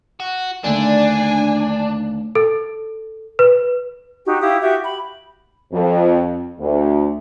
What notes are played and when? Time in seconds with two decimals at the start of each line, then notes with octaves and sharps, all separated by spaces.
0.20 F#4
0.64 D#2 D3 A3 D4 G#5
2.35 A4
3.39 B4
4.25 D#4 F#4 G4
4.41 E4 G4 F5 D#6
4.61 F#4 G4 E5
4.81 B5
5.72 F2
6.59 D2